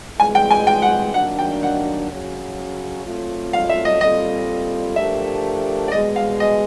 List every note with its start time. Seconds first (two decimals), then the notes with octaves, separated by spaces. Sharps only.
0.19 C3 E3 G#3 G#5
0.35 G5
0.51 G#5
0.67 G5
0.82 F#5
1.14 D#3 F#3 A#3 D4 F#5
1.39 G5
1.63 F#5
2.10 F#2 C#3 F#3
3.05 F#3 A3 C4 F4
3.53 F5
3.69 E5
3.85 D#5
4.01 A#2 G3 C4 F4 A4 D#5
4.96 F3 A3 D4 G4 A#4 E5
5.88 D5
5.92 E2 B2 G#3 D#5
6.16 F5
6.40 D#5